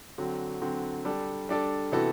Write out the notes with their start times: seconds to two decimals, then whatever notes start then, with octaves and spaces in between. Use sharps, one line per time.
0.18 D3 F#3 C4 F#4
0.62 D3 F#3 C4 F#4
1.05 G3 D4 A4
1.49 G3 D4 A4
1.92 C3 E3 B3 F#4 A4